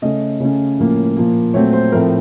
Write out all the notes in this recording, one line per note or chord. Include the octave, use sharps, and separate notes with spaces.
C#3 A3 C#4 D#5
C#3 A3 C#4
A2 F3 A#3 C#4
A#2 F3 A#3
A#2 F#3 A3 C4 C#5
C5
A2 F3 A3 C4 A#4